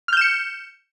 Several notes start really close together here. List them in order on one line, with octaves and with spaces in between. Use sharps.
F6 G6 E7 C#7